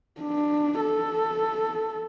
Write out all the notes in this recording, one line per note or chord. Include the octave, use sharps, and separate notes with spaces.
D4
A4